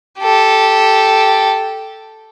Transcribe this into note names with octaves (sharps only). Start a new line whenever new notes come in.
G4 A4